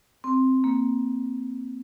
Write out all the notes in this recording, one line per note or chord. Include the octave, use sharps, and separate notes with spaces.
C4
A#3